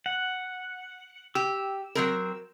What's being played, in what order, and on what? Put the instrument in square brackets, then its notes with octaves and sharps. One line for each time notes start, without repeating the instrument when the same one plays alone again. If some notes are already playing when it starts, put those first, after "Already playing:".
[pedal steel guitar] F#5
[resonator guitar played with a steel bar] G4 [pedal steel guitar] E6
[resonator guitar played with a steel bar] F#3 C4 A#4